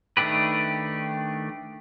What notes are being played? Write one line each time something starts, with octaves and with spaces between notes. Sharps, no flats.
D#3 A3 D4 G4 B4